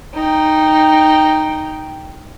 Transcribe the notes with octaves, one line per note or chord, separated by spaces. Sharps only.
D#4 G5